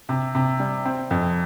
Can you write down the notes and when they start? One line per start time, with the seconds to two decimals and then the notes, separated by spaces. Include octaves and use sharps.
0.09 C3
0.35 C3
0.60 G3
0.85 C4
1.11 F2